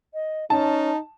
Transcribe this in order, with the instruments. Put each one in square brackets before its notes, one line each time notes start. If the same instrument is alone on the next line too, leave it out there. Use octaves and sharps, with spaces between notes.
[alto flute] D#5
[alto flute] C#4 [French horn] D#4 [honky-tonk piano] A5